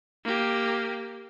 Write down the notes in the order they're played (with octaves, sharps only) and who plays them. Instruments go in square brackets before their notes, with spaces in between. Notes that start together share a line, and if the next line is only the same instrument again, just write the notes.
[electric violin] A#3 G4